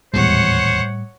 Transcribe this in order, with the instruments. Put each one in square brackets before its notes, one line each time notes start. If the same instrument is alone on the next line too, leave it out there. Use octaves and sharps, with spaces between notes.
[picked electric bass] D#1 E2 G#3 [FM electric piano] A2 G3 [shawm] C5 [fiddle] C#5 F#5